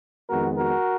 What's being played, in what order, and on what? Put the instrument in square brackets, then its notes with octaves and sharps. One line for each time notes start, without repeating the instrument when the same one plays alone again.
[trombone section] F2 D#3 G#3 B3 F#4 A#4
F#4 A#4